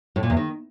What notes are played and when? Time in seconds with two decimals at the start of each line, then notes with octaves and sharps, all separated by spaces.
0.16 A2
0.23 A#2
0.30 E2
0.37 D#3